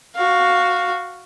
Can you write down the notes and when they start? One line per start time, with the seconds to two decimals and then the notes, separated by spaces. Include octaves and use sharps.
0.15 F#4 F5